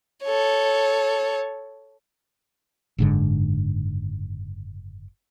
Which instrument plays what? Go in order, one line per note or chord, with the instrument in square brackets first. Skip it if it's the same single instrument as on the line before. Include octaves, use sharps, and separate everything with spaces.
[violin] A4 C#5
[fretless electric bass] F#1 G#2 D3